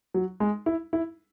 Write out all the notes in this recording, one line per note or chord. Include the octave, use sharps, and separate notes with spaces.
F#3
G#3
E4
E4